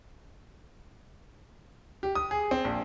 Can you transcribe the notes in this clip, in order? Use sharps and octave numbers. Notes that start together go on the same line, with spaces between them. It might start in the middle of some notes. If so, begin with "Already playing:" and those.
G4
D#6
G#4
C4
A#1